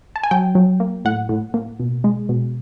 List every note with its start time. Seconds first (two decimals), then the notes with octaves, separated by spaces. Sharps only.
0.16 A5
0.23 G#5
0.31 F#3 G5
0.55 F#3
0.80 A#3
1.05 A2 F#5
1.29 A2
1.54 A#3
1.80 B2
2.04 G#3
2.29 B2